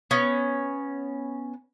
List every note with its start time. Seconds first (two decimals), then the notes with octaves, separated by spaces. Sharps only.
0.11 B3 C#4